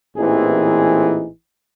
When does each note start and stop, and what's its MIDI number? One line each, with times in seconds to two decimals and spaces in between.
0.17 1.26 33
0.17 1.26 46
0.17 1.26 52
0.17 1.26 60
0.17 1.26 63
0.17 1.26 68